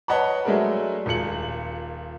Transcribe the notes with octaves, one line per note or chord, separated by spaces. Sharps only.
B4 C#5 D#5 F#5 A5 B5
F#3 G#3 A3 D4 G#4 A#4
D#1 A#2 G#4 C#7 F#7